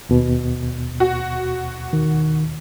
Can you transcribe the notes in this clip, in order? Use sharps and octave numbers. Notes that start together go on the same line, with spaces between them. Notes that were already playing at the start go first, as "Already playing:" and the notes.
D#2 B2
F#4
D#3